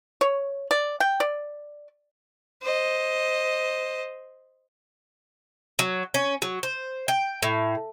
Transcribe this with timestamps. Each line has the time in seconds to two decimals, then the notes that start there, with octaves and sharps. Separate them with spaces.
0.21 C#5
0.71 D5
1.00 G5
1.20 D5
2.62 C5 D#5
5.79 F#3
6.14 C#4
6.42 F#3
6.63 C5
7.08 G5
7.42 A2